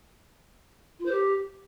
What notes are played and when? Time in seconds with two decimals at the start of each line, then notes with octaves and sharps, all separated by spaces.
0.99 F4
1.05 C5
1.11 G4